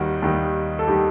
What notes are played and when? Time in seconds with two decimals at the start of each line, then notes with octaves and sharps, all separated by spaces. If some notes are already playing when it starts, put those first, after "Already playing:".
Already playing: D#2 D#3 G3 F#4
0.22 D#2 D#3 G3
0.79 A4
0.88 D#3 G3 G4